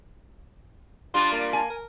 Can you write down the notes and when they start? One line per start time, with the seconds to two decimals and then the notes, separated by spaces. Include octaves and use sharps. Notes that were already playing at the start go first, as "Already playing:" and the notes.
1.14 G3 D4 F4 C6
1.32 A#3
1.53 G#5
1.70 A#4